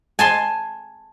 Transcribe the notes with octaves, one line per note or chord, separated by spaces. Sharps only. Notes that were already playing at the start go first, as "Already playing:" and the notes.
G#5 A5 C6